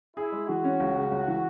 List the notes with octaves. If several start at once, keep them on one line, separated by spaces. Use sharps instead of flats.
E4 G#4
G#3
E3 F#4
C#4
C#2
C#3
C#2
E3